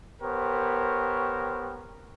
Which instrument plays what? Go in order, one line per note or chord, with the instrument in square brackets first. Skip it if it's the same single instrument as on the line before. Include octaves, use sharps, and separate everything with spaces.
[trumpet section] B3 G4 A#4 C5 C#5